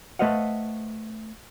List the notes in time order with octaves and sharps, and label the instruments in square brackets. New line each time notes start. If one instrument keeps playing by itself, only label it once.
[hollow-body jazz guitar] A3 B4 C5 D#5 F5 F#5